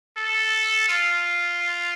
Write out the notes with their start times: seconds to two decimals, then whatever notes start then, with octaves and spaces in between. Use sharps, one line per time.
0.17 A4
0.89 F4